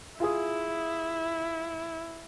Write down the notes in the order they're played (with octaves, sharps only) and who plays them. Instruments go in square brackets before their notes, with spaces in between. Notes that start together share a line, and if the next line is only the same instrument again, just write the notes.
[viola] E4 [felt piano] F4 G#4 D#6